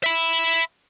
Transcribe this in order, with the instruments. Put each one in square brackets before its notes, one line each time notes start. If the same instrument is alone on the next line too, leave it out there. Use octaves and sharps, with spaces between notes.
[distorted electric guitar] E5 B5